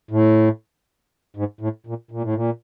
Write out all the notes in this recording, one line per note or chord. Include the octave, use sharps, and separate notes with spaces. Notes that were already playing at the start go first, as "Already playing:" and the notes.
A2
G#2
A2
A#2
A#2
A2
A#2